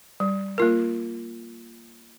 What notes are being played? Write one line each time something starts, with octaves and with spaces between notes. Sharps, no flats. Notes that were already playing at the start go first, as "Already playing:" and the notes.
G3
A#3 F4 A#4